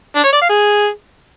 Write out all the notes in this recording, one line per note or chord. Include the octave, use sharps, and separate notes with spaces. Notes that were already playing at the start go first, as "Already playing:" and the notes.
D4
C#5
D5
F5
G#4